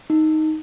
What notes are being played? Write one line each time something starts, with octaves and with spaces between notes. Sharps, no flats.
D#4